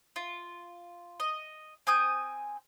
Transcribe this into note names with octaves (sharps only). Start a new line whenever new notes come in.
F4
D#5
C4 G#5 D#6 G6